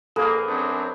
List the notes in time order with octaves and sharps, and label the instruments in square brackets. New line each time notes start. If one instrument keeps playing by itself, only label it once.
[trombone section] A#1 A#3 [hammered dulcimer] G#4 B4 [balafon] A4
[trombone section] F#2 C4 D4